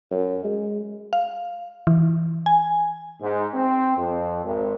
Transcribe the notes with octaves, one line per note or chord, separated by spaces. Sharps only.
F#2
G#3
F5
E3
G#5
G#2
C4
F2
G#1